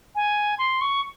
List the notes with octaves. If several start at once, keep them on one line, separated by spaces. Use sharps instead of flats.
G#5
C6
C#6